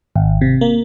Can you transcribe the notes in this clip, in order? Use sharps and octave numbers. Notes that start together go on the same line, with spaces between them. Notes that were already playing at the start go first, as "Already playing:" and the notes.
G#1
C3
A#3